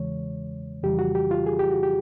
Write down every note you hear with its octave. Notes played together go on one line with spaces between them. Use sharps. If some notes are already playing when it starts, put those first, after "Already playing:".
Already playing: E2 C#3 E3 G#3 C#5
F2 C#3 E3 G3 G4
F#4
G4
F4
G#4
G4
F#4
G4